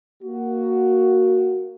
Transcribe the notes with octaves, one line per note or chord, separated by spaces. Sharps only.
A#3 F#4